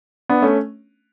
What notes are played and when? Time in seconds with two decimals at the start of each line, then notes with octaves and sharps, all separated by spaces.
0.29 B3 D4
0.42 A3 C#4